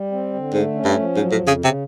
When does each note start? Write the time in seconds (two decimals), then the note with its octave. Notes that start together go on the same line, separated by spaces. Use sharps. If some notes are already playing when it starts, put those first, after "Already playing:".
Already playing: G3
0.12 C4
0.34 D3
0.53 G#2 A3
0.75 C#4
0.85 G2
0.96 F3
1.16 G#2 F#3
1.32 A2
1.37 F2
1.48 C#3
1.59 C#3
1.64 C3